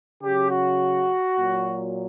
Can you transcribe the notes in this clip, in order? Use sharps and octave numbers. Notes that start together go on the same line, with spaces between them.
C#3 F#3 G4
F#4
A#2 F#3